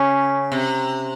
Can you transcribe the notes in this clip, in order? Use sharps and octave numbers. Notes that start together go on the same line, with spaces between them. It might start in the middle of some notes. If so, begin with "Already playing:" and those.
Already playing: C#3 C#4
C3